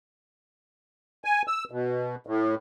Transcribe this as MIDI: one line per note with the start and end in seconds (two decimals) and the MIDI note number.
1.25 1.42 80
1.48 1.64 88
1.71 2.15 47
2.27 2.55 45